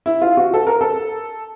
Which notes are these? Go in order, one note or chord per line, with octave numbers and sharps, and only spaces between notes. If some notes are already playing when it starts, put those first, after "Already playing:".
E4
F4
F#4
A4
A#4
A4